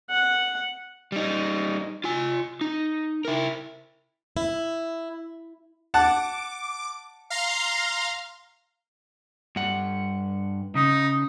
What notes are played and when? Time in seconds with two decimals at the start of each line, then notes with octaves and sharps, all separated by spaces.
0.10 F#5
1.12 G3 D#4
2.04 F4 G#5
2.61 D#4
3.25 E4 A#4
4.37 E4
5.94 F#5 A5 D6
7.30 F5 A#5 C6
9.56 G2 F#5
10.75 C#3 D#4